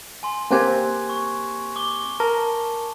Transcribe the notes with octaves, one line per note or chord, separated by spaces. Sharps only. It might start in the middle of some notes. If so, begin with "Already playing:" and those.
G#5 C6
A#3 C4 G4 G#5 F#6 G#6
C#6
D6 G7
A#4 A5